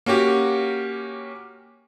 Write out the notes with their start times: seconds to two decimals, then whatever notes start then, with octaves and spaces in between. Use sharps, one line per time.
0.06 A#3 C#4 F#4 G4